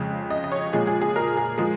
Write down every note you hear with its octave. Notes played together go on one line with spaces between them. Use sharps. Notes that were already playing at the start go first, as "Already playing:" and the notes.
Already playing: F2 C#3 G#3
D#5
D#5
C#5
A#2 F3 G#3 G#4
G#4
G#4
A#4
G#4
F3 G#3 G#4